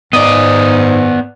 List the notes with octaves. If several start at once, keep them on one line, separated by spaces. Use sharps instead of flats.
G#2 B3 D5 D#5